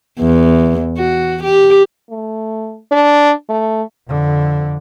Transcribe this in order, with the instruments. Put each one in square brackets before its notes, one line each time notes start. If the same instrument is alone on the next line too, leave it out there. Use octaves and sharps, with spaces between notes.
[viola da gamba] E2
F#4
G4
[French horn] A3
D4
A3
[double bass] F2 D3